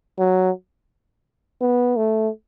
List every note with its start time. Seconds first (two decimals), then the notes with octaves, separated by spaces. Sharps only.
0.18 F#3
1.61 B3
1.96 A3